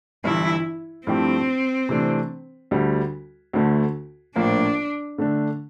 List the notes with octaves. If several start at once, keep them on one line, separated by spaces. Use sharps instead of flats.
G1 G2 E3 E4
G2 F3 A3 C4 E4 G4
C3 E3 A3 D4
D2 D3 G3
D2 D3 A3
A#1 A2 F3 A#3 D4
D3 A3 D4